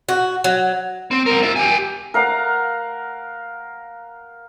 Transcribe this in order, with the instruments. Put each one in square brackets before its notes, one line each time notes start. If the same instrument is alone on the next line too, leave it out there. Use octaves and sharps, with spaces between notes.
[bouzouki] F#4
F#3
[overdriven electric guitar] C4
C4 A#4
F4 E5
G4 G#5
[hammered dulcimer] A#4 F5 F#5 A#5